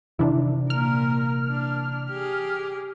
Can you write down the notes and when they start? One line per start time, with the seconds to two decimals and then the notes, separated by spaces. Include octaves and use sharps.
0.19 C3 D#3 E3 D4 E4
0.70 A#2 A#4 F6
1.48 D4
2.09 G4 G#4